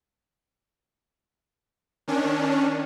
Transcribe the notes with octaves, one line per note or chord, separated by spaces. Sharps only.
D#3 C#4 D4